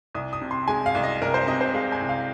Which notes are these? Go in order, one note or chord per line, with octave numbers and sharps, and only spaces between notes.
C2 D#6
D#6
C3
C6
G#3 G#5
F5
C2
D#5
C2 A#4
C5
C3 D#5
C5
G#3 F5
G#5
C2
F5